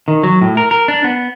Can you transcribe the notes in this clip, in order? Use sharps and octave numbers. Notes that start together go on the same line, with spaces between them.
D#3
F#3
A2
A#4
A#4
D4
B3